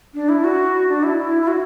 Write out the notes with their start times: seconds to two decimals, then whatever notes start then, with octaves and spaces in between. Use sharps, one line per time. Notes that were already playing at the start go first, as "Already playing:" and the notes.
0.14 D4
0.29 E4
0.44 F#4
0.89 D4
1.03 E4
1.18 E4
1.42 E4
1.48 F#4